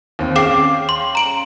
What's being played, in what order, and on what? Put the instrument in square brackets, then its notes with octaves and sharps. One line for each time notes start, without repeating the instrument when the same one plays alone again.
[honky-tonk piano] D#2 C4
[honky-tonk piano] C#4 F5 G5 [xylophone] G#4 D6 C7
[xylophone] C6
A#5 D7 F#7